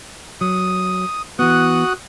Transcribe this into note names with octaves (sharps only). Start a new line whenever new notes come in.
F#3 D#6
E3 B3 F#4 D#6 F#6